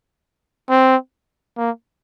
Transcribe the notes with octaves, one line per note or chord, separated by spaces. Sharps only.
C4
A#3